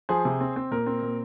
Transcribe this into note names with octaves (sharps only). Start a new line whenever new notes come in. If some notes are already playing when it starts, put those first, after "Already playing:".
F3 G#4 C5
C3
C4
C4
A#2 A#4
C4
A#2